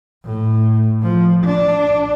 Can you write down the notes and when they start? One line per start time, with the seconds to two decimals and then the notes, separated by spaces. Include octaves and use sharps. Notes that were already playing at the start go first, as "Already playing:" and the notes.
0.25 A2
1.02 F3
1.45 D4